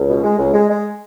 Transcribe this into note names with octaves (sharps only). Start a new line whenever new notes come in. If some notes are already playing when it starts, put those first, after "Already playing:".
Already playing: C#2
B2
G#3
C#2
G#3
G#3